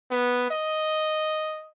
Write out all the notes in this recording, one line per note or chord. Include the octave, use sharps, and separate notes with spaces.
B3
D#5